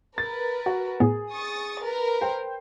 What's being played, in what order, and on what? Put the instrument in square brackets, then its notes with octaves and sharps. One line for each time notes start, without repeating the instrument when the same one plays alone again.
[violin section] A#4 B4 [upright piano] A6
[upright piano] F#4
[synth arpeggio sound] A2 B3 [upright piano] G#4
[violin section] C#6 D#6 A6
A#4 B4
[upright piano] C5 G5